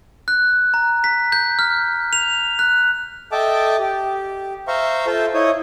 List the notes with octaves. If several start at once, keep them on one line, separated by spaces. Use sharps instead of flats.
F#6
A#5
B6
G6
F6
F7
F#6
A4 D#5 E5 G5 A5 D6
G4
C5 E5 F5 A#5 C#6
F4 A4 C5 E5
E4 C#5 D#5 D#6